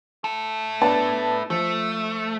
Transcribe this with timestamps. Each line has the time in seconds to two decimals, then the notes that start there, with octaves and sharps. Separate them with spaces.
0.24 E4 A4
0.82 B3 D4 A5
1.50 F3 A3